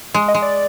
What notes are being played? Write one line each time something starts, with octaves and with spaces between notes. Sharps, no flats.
G#3
D#5
G#3
D5